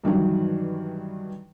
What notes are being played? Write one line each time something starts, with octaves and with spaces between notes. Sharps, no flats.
G2 D#3 E3 F#3